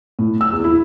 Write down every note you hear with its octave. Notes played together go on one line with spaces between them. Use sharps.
A2
E6
E2
E4